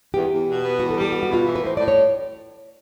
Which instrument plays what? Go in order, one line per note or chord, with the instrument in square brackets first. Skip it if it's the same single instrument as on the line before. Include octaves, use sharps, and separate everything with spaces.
[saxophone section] E2 [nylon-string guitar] G4
[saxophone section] E2
B2
B3
[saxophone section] E2 [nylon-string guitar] F#4
[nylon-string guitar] A4
[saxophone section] G3
[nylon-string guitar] G4
[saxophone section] B3 [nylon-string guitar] F#4
[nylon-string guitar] F#4
[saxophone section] B2
[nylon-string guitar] F4
[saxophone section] E3
[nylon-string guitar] B4
[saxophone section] A2
[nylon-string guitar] C5
[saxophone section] A2 [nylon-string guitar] D5
[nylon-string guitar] C#5